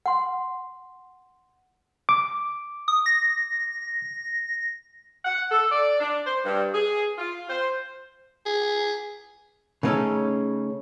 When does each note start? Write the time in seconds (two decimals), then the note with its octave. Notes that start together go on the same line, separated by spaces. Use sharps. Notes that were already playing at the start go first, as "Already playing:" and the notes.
0.06 F#5 C6
2.09 D6
2.88 D#6
3.06 A#6
5.25 F#5
5.51 A4
5.71 D5
6.00 D4
6.25 C5
6.44 G2
6.73 G#4
7.18 F4
7.49 C5
8.46 G#4
9.83 C#3 A3 B3 C#4 D#4 A4